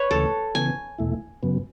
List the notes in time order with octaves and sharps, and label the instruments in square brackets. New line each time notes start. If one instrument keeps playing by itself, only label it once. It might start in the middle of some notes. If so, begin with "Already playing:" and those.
Already playing: [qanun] B4 C#5
[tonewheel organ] D2 C#3 E3 A3 [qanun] A4
[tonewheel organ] C#3 E3 B3 [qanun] G#5
[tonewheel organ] E2 B2 A3 E4
F#2 C#3 F#3 B3